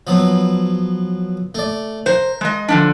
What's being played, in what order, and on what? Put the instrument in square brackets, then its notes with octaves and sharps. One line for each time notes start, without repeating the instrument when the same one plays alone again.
[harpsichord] F3 F#3 B3
A3 D5
[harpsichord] A#4 [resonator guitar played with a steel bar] C5
[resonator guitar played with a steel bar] G#3 D#5
D3 F3 D4